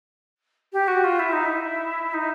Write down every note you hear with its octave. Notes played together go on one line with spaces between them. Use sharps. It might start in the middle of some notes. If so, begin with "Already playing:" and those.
G4
F#4
F4
E4
D#4
E4
D#4